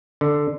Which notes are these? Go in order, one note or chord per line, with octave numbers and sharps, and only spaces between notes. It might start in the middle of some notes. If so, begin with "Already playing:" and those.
D3